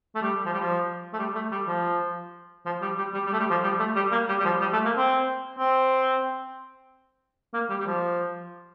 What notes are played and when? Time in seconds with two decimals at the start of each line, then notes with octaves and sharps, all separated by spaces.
0.15 A3
0.22 G3
0.46 F3
0.53 G3
0.60 F3
1.13 A3
1.19 G3
1.35 A3
1.52 G3
1.67 F3
2.66 F3
2.82 G3
2.98 G3
3.14 G3
3.26 G3
3.33 A3
3.39 G3
3.50 F3
3.63 G3
3.79 A3
3.96 G3
4.12 A#3
4.29 G3
4.40 G3
4.45 F3
4.61 G3
4.73 A3
4.85 A#3
4.97 C4
5.58 C4
7.54 A#3
7.70 G3
7.80 G3
7.86 F3